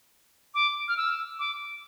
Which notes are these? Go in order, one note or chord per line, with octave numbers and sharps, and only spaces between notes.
D6
F6
E6
D6